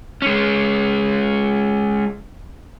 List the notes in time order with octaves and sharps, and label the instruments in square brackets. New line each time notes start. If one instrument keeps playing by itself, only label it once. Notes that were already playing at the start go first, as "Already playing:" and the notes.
[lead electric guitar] G#3 C#4